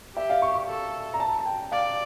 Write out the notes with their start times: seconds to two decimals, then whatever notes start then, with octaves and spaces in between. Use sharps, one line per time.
0.16 G4 E5
0.30 F5
0.42 C#6
0.55 C#6
0.68 A4
1.14 A#5
1.20 A5
1.39 A5
1.46 G5
1.72 D5 F5